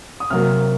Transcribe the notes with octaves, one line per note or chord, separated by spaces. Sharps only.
D#6
C3 F#3 A#3 F6